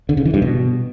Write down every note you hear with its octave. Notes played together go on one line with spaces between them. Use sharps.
D3
C#3
E3
G2
B2